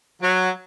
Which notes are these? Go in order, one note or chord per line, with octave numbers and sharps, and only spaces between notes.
F#3